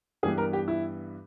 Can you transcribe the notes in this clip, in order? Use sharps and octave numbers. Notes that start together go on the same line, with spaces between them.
G2 E3 G3 B3 G#4
A#4
G4
E4